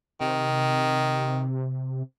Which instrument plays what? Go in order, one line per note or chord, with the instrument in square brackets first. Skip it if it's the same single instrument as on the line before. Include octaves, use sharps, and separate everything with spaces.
[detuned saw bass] C3 [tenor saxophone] D#3